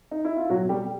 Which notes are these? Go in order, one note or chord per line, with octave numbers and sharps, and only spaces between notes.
D#4
E4
F4
B2 F#3 F#4
G3 G4